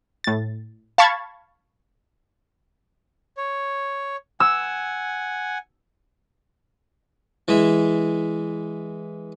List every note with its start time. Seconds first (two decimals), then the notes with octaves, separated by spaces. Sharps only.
0.24 A2 A6
0.98 F5 A5 B5 C#6 G#6 A6
3.37 C#5
4.40 F#5 G#5 E6
7.48 E3 G#3 E5